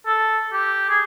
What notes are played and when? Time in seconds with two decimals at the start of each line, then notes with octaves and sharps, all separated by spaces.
0.07 A4
0.53 G4
0.90 G#4